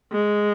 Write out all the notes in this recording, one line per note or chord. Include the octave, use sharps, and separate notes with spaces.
G#3